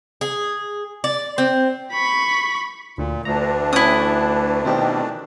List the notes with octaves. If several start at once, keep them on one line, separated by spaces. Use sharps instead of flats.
G#4
D5
C4
B5 C#6
D2 A#2
D2 E3 A3 D4 A#5
C#4 E4 G5 D#6
B2 D#3 C4 G4